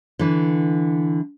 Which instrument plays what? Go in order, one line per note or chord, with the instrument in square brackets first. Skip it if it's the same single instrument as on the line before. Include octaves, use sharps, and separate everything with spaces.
[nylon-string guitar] D3 E3